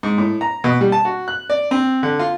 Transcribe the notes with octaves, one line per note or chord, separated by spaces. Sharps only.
G#2
A2
A#5
B2
G3
A5
F#4
F#6
D5
C4
D3
F4